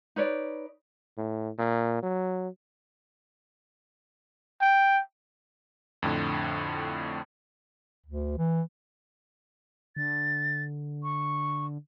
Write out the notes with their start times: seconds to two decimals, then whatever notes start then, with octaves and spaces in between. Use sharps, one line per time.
0.16 D#4 B4 C#5 D5
1.17 A2
1.58 A#2
2.03 F#3
4.61 G5
6.02 F2 A2 D3
8.06 D2
8.38 E3
9.97 D3 A6
11.03 C#6